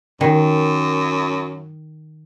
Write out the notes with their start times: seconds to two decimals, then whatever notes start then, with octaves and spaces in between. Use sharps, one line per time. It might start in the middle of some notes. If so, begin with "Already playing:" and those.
0.21 F#2 D#3